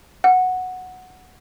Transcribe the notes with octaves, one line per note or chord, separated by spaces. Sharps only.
F#5